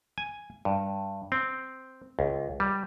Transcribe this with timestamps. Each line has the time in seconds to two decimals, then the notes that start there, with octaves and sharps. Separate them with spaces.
0.18 G#5
0.65 G2
1.32 C4
2.19 C#2
2.60 G3